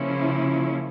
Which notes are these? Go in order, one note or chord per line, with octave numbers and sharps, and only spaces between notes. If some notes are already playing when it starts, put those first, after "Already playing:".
Already playing: C#3 F3 A#3 C#4 E4